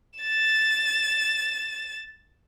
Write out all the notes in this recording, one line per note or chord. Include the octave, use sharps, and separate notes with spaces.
A6 E7